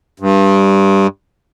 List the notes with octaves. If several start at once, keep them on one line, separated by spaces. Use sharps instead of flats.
G2